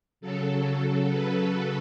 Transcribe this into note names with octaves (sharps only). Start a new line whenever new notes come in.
C#3 F#3 A4
B4